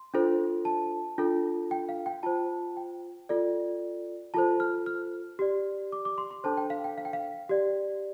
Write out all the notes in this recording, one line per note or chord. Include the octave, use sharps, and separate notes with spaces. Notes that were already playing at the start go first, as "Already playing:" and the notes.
Already playing: C6
D4 F4 A4 C5
A5
D4 F4 A4
G5
F5
G5
F4 C5 A5
G5
F4 A4 D5
F4 A4 C5 A5
F6
F6
G4 D5
D6
D6
C6
C6
D4 A4 C5 A5
G5
F5
G5
F5
G5
F5
G4 D5